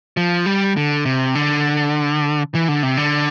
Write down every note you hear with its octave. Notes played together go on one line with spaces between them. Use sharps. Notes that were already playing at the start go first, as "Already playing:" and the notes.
F3
G3
D3
C3
D3
E3
D3
C3
D3